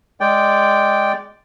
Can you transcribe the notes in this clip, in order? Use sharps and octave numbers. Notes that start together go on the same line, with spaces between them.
G#3 D5 G5